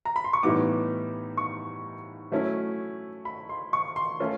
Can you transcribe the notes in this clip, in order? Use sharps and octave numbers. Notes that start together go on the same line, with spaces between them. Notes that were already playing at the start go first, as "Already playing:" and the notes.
A#5
B5
C6
C#6
A2 E3 G3 B3 D#4 D6
C#6
F#3 A3 C#4 E4
B5
C6
C#6
C6
A3 C#4 F4